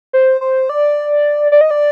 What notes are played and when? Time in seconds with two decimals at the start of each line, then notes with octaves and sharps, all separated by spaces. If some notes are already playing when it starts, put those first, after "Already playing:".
0.13 C5
0.41 C5
0.69 D5
1.52 D5
1.61 D#5
1.71 D5